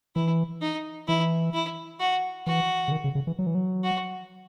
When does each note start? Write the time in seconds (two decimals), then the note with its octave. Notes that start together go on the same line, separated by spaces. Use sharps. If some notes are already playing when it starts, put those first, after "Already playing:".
0.15 E3 E4
0.62 D#4
1.07 E3 E4
1.53 E4
2.00 F#4
2.46 E3 F#4
2.88 C#3
2.92 D#3
3.04 C#3
3.15 C#3
3.27 E3
3.39 F#3
3.47 E3
3.55 F#3
3.84 F#4